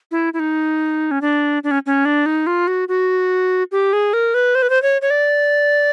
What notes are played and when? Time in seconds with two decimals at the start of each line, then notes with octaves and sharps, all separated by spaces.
0.11 E4
0.34 E4
0.39 D#4
1.11 C#4
1.22 D4
1.64 D4
1.71 C#4
1.86 C#4
2.05 D4
2.26 D#4
2.47 F4
2.67 F#4
2.89 F#4
3.72 G4
3.93 G#4
4.13 A#4
4.34 B4
4.55 C5
4.62 B4
4.70 C5
4.82 C#5
5.02 C#5
5.10 D5